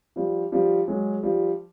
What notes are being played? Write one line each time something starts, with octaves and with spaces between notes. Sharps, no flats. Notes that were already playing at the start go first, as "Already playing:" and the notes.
F3 G3
F3 G3
F#3 G#3
F3 G3